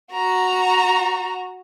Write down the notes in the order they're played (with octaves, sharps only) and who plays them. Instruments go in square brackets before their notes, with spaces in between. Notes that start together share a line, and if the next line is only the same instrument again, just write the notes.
[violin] F#4 A#5